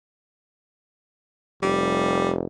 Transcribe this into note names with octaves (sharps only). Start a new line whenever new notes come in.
F1 G3